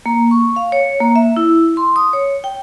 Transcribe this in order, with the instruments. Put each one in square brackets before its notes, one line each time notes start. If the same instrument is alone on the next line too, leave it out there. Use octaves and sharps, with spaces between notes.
[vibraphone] A#3
C#6
F5
C#5
A#3
E5
E4
C6
D#6
C#5
G5